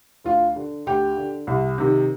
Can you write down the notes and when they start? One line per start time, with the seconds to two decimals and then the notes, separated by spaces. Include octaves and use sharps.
0.24 D2 F4
0.56 D3
0.86 D2 G4
1.17 D3
1.47 C2
1.78 C3 D#3